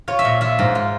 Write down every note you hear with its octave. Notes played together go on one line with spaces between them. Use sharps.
F4 C#5
E5
A#2
F4 E5
G#2
F4